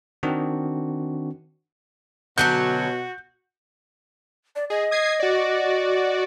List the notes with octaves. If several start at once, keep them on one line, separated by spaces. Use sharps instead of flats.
D#3 C4 D4 F#4
B2 D3 F#3 C#4 F#4 F#6 G6
D5
G#4 D#5
D#6 G#6 C7
F#4 D5